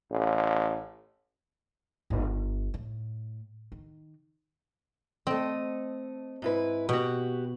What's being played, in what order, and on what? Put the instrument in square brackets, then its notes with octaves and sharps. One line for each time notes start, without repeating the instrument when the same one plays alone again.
[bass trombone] A1
[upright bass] G1 B3
A2
D#3
[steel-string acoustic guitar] A3 D#5 [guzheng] C4
[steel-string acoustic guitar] G#2 E4 B4
[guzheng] B2 [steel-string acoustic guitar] F#4 G4 B4